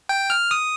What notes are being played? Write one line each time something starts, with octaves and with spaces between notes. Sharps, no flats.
G5
F6
D#6